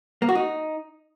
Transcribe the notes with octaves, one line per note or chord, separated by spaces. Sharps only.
A#3
F#4
D#4